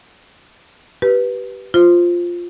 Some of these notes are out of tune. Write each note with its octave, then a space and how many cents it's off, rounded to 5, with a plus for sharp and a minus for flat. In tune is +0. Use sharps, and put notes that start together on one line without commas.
G4 -20 B4 -10
F4 +0 C5 -5